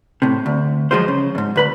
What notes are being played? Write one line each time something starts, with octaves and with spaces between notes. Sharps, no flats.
A2 C3
D2
F3 F#3 G#3 F4 C5
C#3
E2 G#2
D2 B4 B5